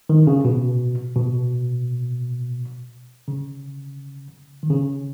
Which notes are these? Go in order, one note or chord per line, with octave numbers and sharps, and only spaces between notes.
D#3
C#3
B2
B2
C#3
D#3
C#3